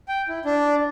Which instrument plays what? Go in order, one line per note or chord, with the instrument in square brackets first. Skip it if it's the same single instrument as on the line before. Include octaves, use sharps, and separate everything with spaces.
[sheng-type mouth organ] G5
E4
D4